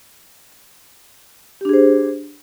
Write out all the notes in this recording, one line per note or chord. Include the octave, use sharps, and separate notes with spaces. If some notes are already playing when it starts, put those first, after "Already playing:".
D4 G4 G#4 C5